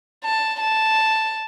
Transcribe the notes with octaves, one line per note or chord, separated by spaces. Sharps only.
A5
A5